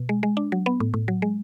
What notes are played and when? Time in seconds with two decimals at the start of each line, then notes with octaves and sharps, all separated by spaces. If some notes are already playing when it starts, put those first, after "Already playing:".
Already playing: B2
0.09 G#3
0.23 G#3
0.37 D4
0.52 F#3
0.66 B3
0.80 A2
0.94 A2
1.08 F#3
1.22 G#3